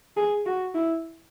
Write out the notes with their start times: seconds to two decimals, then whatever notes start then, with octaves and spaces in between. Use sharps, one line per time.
0.17 G#4
0.46 F#4
0.75 E4